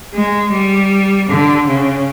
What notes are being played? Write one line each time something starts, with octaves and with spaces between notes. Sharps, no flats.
G#3
G3
D3
C#3